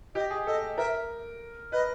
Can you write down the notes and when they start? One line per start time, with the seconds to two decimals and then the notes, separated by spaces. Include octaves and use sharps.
0.15 G4 D#5
0.30 G#4
0.47 A4 D#5
0.78 A#4 E5
1.72 B4 D#5